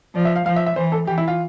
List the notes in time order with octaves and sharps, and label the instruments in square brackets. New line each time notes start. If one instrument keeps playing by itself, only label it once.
[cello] F3 [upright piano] D5
[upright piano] E5
F5
[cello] F3 [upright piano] F5
[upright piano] E5
E5
[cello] E3 [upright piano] C5
[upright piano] A4
[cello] E3 [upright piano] G4
[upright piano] E4
F4